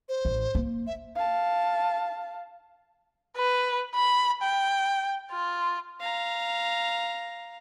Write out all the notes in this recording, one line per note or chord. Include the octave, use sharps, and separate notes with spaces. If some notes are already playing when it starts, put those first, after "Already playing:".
C5
A1
A#3
E5
F5 A5
B4
B5
G5
F4
F5 A#5